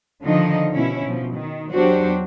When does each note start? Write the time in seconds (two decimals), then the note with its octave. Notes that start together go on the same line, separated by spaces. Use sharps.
0.24 D3 D#3 F3 D#4 D#5
0.72 B2 C#4 E4
1.05 B2 F3
1.35 D#3
1.72 E2 F#3 D4 F#4 G4 C5